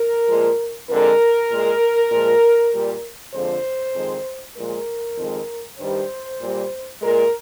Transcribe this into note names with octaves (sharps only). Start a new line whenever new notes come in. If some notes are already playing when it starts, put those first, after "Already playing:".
Already playing: A#4
A#2 F3 G#3
F2 D3 G#3 A#4
A#2 G#3
A#2 F3 G#3
A#2 G3
F2 D3 F3 G#3 C5
F2 D#3 G#3
A#2 F3 G#3 A#4
F2 D#3 G#3
G2 D#3 G3 C5
A#2 G3
A#2 G#3 A#4